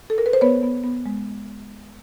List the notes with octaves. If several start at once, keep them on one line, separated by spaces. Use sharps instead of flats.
A4
A#4
B4
C5
B3 B4 C#5
B3
B3
G#3